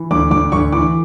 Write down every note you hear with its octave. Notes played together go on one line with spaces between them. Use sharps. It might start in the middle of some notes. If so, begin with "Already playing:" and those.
Already playing: E3
D2 D6
D2 D6
D2 C#6
E3 D6